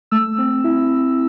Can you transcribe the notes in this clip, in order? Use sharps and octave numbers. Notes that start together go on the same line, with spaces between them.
A3 E6
C4
E4